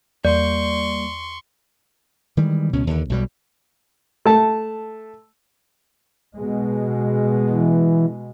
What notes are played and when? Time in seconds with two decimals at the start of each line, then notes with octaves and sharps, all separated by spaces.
0.25 E2 G3 A#3 D5 C6 C#6
2.37 D#3 E3 G3 G#3
2.73 C#2 B2 C#4
2.87 D#2 D3
3.10 B1 B2 G3
4.25 A3 A5
6.35 B2 G#3
7.50 E3